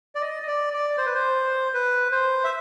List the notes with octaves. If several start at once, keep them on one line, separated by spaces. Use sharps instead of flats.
D5
D#5
D#5
D5
D5
C5
B4
C5
B4
C5
E5